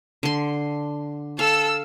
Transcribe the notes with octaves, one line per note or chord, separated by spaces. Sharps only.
D3 C6
A4 F5 E6